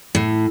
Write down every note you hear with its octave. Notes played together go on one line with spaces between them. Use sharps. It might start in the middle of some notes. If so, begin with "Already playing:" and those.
A2